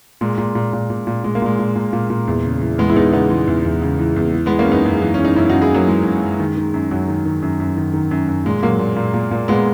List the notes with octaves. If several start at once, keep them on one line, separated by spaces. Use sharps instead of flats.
A#2 G#3
A#2
A#2
A#2
A#2
A#2
A#2 G#3
A#3
A#2 G#3
A#2
A#2
A#2
A#2
E2
C#3
E3
E2 G#3 B3
E4
E2 B3 D#4
C#3 B3 D#4
E3 G#3
E2
E2
C#3
E3
E2
E3
E3 G#3 B3
A#3 C#4
F#2 B3 D#4
F#2
E3
E3 C#4
D#4
F#2 C#4 E4
F#2 D#4 F#4
E4 G#4
E3 F#3 A#3
E3 G#3
F#2
F#2
D#3
D#3
F#2
F#2 F#3
D#3
D#3
F#2
F#2
D#3
D#3
F#2
F#2
A#2 G#3
A#2 F#3 A#3
A#2
A#2
A#2
A#2
A#2 G#3 B3